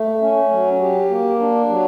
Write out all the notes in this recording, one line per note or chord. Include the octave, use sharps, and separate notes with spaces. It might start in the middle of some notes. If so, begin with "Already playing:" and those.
Already playing: A3
C#4
F#3
G4
A#3
D4
F#3